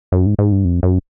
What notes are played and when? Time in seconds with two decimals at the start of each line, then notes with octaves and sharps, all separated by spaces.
0.12 F#2
0.26 G#2
0.39 G#2
0.52 G2
0.65 F2
0.83 F#2